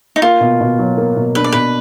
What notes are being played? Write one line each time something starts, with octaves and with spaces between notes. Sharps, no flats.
D#4
A#3 F4
B2
B2
F#3
A#3
B2
D4 B4
D5
B2 B4